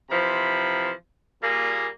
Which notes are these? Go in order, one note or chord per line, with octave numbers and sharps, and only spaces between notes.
C3 E3 F3 B5
A#2 G3 A#3 G#4